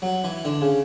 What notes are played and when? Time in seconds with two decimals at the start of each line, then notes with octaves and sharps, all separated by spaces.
0.02 F#3
0.24 E3
0.45 D3
0.61 C#3